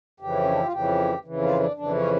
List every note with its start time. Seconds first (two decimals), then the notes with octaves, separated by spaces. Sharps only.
0.20 F2 C#3 E3 G4
0.43 C#4
0.50 D4
0.57 E4
0.65 F4
0.72 F2 C#3 E3 G4
1.25 F2 C#3 E3
1.42 F4
1.60 D4
1.76 F2 C#3 E3 D4
1.94 C#4